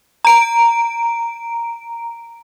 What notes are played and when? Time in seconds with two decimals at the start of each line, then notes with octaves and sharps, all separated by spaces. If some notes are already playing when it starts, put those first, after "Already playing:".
0.25 A#5 D7